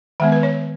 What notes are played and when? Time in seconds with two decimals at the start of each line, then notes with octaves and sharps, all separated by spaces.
0.20 D#3 G#3 B3 E5
0.32 B4
0.43 C#5